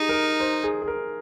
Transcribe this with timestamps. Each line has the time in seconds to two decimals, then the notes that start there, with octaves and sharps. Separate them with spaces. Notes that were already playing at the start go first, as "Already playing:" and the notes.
Already playing: D#4 G4 G#4
0.09 A#4
0.40 C5
0.64 G#4
0.82 G#4
0.88 A#4